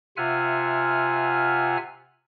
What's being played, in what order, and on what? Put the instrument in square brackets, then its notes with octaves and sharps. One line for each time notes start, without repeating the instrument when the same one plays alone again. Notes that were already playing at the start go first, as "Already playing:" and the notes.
[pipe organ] C3 F4 E5 F#5 G#5 F6